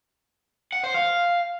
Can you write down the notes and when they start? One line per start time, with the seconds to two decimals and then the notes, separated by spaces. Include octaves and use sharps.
0.73 F#5
0.84 C5
0.94 F5